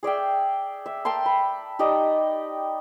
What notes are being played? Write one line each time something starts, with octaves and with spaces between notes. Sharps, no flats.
G#4 D5 E5 G5
E5
A#4 G5 A5 C6
B5
D#4 G4 D5 D#5